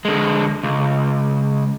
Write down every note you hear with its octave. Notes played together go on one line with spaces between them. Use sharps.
D3 G#3
C#2